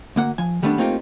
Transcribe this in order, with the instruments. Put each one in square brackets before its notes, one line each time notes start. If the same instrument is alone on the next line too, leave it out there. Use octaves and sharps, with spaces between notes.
[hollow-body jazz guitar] D2 A#3 F#5
F3 G#5
D#3 G3 A3 B3 C#4 D4
A3 A#3 C4 D#4 F4 G4